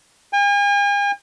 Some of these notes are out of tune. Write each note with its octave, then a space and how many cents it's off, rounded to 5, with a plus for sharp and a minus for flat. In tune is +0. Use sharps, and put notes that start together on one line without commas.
G#5 -45